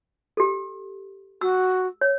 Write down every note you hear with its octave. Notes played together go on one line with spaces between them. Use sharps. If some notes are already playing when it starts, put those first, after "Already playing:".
G4 A4
F#4 E6
C#5